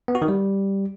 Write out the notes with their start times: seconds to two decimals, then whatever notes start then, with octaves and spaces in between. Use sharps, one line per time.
0.08 B3
0.15 F#4
0.22 D#3
0.28 G3